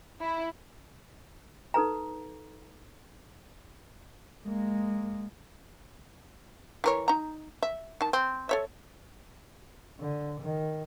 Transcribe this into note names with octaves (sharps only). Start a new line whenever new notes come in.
E4
D#4 A4 B4 A#5
G#3 A#3
E3 A#4 C#5
D#4 A#5
E5
D#3 A5
C4
A4 C#5 E5
D3
D#3